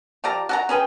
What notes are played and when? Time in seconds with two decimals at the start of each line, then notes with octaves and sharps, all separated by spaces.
0.24 F3 G4 D5 A#5
0.49 F#4 A5 A#5
0.69 C#4 G#4 B4 G5